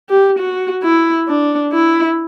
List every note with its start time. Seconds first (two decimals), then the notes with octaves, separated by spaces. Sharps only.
0.09 G4
0.39 F#4
0.83 E4
1.28 D4
1.72 E4